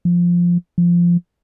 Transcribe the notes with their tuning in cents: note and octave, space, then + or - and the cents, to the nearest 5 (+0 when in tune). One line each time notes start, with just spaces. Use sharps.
F3 +0
F3 -10